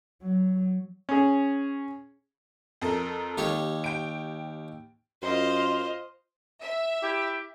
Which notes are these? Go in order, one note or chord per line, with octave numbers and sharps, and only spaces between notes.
F#3
C#4 G#4
F2 A4 A#4
D#2 G4 C#5
G5 D7
F#2 F4 C5 D#5
E5
E4 G4